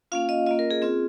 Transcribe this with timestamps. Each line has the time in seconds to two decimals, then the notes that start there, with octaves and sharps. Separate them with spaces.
0.12 A#3 C#4 F4 F5
0.29 D#5
0.46 A#3 C#4 F4 D#5
0.59 A#4
0.71 G#4
0.82 C4 F4 G#4